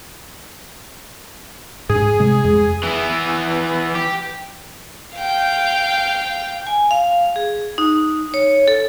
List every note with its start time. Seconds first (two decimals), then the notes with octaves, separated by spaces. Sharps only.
1.89 G#2 D4 G#4
2.19 C3 G#3
2.44 F2 G#3
2.83 E3 B3
3.95 G4
5.16 F5 G5
6.67 G#5
6.91 F5
7.36 G#4
7.78 D#4
8.34 C#5
8.68 A4